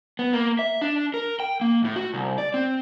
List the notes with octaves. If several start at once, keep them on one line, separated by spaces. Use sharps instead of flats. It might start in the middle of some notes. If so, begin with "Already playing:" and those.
B3
A#3
E5
D4
A#4
G5
A#3
A2
F#4
C2
D5
C4